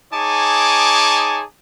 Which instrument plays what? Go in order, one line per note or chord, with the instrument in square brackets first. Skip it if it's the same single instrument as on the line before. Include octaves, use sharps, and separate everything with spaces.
[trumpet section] D#4 G#4 C#5 G#5 A5 D6